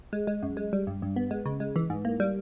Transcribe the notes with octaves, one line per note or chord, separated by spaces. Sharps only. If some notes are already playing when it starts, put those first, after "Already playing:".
G#3
G#3
F#2
G#3
G3
G2
G2
B3
G#3
C#3
G#3
E3
G#2
A#3
G3